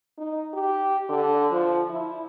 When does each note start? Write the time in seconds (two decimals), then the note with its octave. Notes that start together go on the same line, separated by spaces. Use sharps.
0.18 D#4
0.53 G4
1.09 D3
1.51 F3
1.89 E4